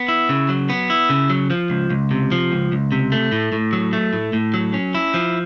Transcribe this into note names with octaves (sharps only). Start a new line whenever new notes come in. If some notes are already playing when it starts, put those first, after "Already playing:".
Already playing: B3
E4
C#3
F#3
B3
E4
C#3
F#3
F3
C#2
C#2
C3
F3
C#2
C#2
C3
A3
A2
A2
F#3
A3
A2
A2
F#3
C#4
E4
F3